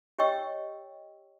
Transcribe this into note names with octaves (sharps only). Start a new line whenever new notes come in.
G4 C#5 D#5 G5 C#6 E6